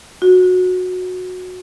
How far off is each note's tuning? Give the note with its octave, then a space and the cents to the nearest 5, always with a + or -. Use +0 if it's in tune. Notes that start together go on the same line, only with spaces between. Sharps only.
F#4 -15